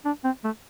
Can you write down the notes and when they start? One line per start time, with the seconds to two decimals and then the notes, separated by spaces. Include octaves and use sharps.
0.05 D4
0.24 C4
0.44 A3